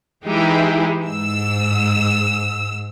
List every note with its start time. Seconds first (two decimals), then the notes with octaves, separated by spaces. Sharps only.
0.24 E3 G#3 D#4 E4 G4 G#4
1.05 G#2 E6